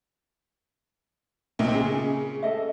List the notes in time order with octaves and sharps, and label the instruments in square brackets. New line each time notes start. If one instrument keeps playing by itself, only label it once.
[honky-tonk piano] B1 A#2 C4 [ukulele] D#4 E5
[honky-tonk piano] C#3 [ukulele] G#4
[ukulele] A4 D#5 E5